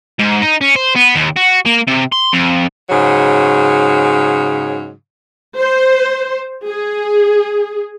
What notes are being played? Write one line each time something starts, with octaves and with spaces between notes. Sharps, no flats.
G#2
D#4
C#4
C5
B3
D#2
F#4
A#3
C3
C6
F2
G#2 C#3 F#3
C5
G#4